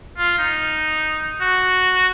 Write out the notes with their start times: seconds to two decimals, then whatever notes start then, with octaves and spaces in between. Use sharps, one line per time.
0.18 F4
0.38 D#4
1.41 F#4